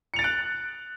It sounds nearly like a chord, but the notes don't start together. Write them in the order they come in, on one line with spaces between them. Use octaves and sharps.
C#7 F7 A6 D7 F#6